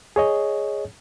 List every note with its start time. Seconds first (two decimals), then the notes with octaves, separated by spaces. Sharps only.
0.16 G#4 C#5 D#5